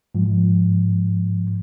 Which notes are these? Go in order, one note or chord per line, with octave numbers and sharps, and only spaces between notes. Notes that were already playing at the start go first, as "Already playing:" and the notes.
G#2 F3